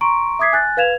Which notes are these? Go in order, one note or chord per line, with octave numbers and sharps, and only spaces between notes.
A#5 C6 C#6 D7
E5 D6 D#6 G#6 B6 C7
G#5 F#6 A6
B4 F5 G#6 E7 F7